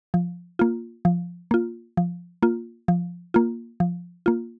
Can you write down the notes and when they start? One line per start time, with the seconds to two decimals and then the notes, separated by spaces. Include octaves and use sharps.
0.14 F3
0.59 A#3 F4
1.05 F3
1.51 A#3 F4
1.97 F3
2.42 A#3 F4
2.88 F3
3.34 A#3 F4
3.80 F3
4.26 A#3 F4